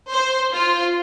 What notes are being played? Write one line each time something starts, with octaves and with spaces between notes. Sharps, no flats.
C5
F4